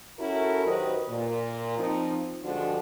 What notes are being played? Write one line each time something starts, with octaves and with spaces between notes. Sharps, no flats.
C#4 E4 F#4 A4 A#4
D#3 F#3 G4 B4 C5 D#5
A#2
F3 C4 D#4
G2 D3 F3 G#3 D4 F#4